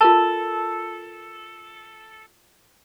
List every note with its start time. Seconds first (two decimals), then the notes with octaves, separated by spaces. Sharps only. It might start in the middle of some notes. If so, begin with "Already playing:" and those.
0.01 F4 A4 A#4 A5